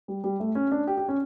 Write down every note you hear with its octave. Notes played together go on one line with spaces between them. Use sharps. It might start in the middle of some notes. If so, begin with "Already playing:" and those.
G3
G3
A3
C#4
D4
G4
G4
C#4